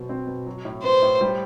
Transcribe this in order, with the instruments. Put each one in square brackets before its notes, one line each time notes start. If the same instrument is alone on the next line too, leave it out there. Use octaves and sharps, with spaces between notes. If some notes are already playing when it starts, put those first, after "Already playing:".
Already playing: [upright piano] B2 F#3 C5
C4
B2
F#3
A2
[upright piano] B3 [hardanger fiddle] C5
[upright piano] A2
G3